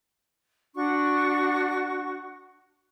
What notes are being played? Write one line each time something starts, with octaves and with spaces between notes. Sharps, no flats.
D4 F#4 C#6